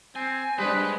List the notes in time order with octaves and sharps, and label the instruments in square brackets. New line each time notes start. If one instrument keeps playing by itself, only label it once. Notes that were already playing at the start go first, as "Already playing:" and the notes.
[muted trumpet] C4 [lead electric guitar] G#5
[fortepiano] G3 D4 [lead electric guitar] G#3 [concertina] G#4 C5 [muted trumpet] B4